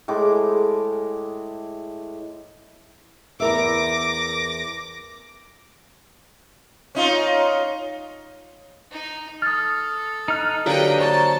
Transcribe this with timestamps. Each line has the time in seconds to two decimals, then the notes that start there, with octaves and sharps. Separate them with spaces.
0.08 A2 G#3 D6
3.40 E2 A#4 E5 D6 A#6
6.95 C#4 D#4 F4
8.91 D#4
9.42 A4 D#6 F6 A6
10.28 D#4 F6 F#6
10.66 D3 F#3 A#3 G4 B4 D#5 G5
10.99 C5 A5 A#5 C#6